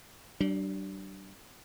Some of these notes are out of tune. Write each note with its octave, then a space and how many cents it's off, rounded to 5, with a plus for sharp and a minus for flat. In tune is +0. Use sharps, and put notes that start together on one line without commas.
G3 -40 D4 +10